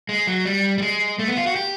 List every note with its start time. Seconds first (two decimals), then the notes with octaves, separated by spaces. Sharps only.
0.09 G#3
0.27 F#3
0.46 G3
0.78 G3
0.82 G#3
1.19 A3
1.28 B3
1.37 F4
1.47 F#4
1.56 G4